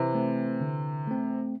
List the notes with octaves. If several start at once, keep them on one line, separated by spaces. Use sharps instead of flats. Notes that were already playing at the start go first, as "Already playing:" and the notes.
Already playing: C3 E3
A3 C4
D3
A3 C4